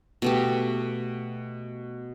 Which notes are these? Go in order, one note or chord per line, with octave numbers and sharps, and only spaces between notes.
B2 A3 G4